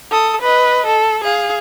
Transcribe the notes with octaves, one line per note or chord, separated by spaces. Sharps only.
A4 D#6
B4 D#5
A4
G#4 F5